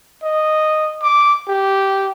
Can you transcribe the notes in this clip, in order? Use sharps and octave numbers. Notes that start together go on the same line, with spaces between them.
D#5
D6
G4